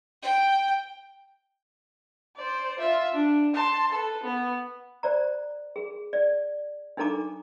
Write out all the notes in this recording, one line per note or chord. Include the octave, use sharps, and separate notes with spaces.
G5
C5 D5
F4 E5
D4
A5 C6
A4 B4
B3
C5 D5 A#5
G#4
D5
D4 D#4 A4 A#5 D6